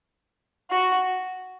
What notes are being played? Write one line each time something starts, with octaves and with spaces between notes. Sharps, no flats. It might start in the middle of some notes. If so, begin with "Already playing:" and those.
F#4